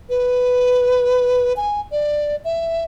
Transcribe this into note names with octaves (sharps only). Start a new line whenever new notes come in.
B4
G#5
D5
E5